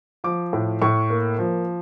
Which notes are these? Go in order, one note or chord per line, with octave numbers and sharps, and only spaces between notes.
F3 D6
A2
A2 C#6
A#3
F3